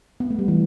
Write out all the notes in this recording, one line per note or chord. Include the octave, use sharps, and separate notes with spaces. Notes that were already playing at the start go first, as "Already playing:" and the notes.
B3
A3
G3
E3